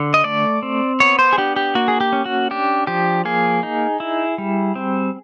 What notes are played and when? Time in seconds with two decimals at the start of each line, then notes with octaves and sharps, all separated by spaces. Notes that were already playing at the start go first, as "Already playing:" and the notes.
Already playing: D3
0.14 D#5
0.24 A3 D5
0.63 C4
1.00 B3 C#5
1.19 C5
1.33 G#4
1.38 D4 G4
1.56 G4
1.75 A#3 F#4
1.88 G#4
2.01 G4
2.13 C#4
2.26 F#4
2.51 D4 G4
2.87 F3 G4
3.25 A#3 G#4
3.63 D#4
4.00 E4
4.38 G3
4.75 C4